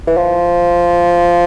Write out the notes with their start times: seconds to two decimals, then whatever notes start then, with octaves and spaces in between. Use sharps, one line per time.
0.07 E3
0.17 F3